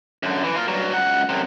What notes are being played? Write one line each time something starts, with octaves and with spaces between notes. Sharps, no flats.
F#2 D3
E3
F4 A#4
G2 F#3
C#2 F#5
F#2 C3